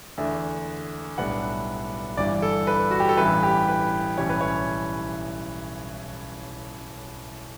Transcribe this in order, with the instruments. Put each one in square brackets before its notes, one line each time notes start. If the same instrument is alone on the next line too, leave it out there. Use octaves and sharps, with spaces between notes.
[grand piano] E2 D3 A3 D4
B1 A2 G3 B3 D4 F#5
G1 G2 E3 D5
A4
B4
F#4
G4
A4
A1 G2 E3 B4
G4
B4
B1 A2 E3 G3 C#4 C#5
B4
C#5